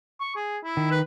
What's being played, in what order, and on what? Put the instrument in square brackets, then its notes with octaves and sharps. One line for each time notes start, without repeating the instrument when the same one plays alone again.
[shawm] C#6
G#4
E4
[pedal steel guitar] D#3
[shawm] B4